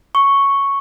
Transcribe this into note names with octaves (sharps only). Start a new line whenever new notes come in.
C#6